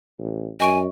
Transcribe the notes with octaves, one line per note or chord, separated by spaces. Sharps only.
A1
F#2 D#5 G#5 C#6 D7